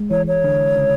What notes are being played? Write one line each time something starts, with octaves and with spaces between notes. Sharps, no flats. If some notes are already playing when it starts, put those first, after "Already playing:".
Already playing: G#3
E3 C#5
C#5
D3
C#3